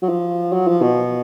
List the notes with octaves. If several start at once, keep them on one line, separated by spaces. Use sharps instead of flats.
F#3
F3
F#3
F3
B2